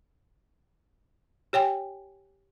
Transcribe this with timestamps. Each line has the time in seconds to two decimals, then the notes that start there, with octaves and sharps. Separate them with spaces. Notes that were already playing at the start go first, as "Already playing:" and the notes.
1.53 G4 C#5 G5 G#5